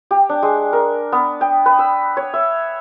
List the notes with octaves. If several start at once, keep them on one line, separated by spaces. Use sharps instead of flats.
G4
D4
G#3
A#4
B3
G5
B4
E6
C#5
E5